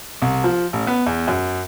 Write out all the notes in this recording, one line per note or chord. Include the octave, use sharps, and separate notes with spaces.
C2
F3
A1
B3
E2
F#2